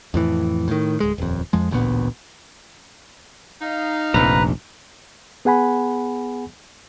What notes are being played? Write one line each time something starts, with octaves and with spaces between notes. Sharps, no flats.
F2 A2 E3
A2 D#3
D1 G#3
D#1 F2
F2 F3 G#3
A1 D2 A#2 B3
D#4 F5
F1 A#1 B4 A#5
B3 G#4 F#5 G#5 B5